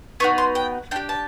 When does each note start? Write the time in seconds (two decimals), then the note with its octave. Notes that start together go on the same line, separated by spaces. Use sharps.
0.20 B3 D#4 F#4 C#6
0.38 C6
0.55 G5
0.91 D4 G4 G5
1.09 A5